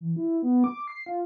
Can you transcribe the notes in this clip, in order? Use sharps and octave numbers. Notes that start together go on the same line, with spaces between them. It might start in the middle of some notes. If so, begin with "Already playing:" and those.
E3
E4
B3
D6
C7
F4